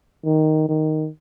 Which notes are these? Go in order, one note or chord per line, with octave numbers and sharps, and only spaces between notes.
D#3
D#3